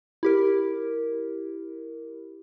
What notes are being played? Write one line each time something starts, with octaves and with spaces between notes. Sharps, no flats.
E4 G4 A#4